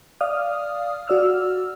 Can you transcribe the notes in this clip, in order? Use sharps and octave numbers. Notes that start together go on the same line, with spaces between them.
D5 F5 D#6 F6
F#4 D5 E6 F6